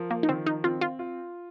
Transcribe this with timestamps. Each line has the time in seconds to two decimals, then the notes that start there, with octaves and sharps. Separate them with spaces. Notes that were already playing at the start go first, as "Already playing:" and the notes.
Already playing: F3 A#4
0.11 A#3
0.23 D#4
0.29 D#3 C4
0.46 D#4
0.64 C4 F4
0.81 F4
0.99 F4